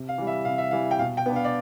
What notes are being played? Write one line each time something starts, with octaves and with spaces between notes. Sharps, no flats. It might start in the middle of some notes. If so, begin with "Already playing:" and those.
Already playing: C3
F5
E3 G3
E5
C3 F5
E5
E3 G3 F5
G5
B2 F5
G5
B3 D4
F5
D5